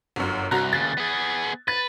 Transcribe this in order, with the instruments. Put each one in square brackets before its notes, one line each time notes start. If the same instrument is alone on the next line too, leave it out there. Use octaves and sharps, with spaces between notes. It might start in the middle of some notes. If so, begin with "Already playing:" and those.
[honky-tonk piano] G1 F#2
[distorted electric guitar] C2 [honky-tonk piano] F#4 A#5 F#6
[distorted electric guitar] D#2 C#3 [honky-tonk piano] A6
[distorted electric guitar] B3 G#4
[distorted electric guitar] B4 [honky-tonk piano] A6